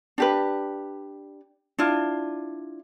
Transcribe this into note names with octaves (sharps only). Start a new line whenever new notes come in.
D4 G4 B4
D4 E4 F4